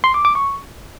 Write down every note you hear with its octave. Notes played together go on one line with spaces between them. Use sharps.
C6
D6
D6
C#6